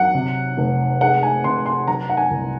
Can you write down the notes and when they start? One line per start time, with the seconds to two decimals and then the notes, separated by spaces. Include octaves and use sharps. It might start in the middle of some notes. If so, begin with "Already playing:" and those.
Already playing: F#3 F#5
0.15 C3
0.58 F1
1.01 G#3 F#5
1.23 G#5
1.44 C3 C6
1.66 C6
1.88 F#3 A#5
2.09 F#5
2.17 G#5
2.31 C2